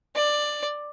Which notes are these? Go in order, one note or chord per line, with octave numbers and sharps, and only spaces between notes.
D5